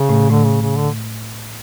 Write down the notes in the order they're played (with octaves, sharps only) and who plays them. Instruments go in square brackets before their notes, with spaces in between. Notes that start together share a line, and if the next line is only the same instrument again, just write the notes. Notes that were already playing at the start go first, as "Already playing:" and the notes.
Already playing: [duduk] C#3
[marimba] A2 A3
[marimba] A2 A3 [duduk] D3
[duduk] C#3
C#3
D3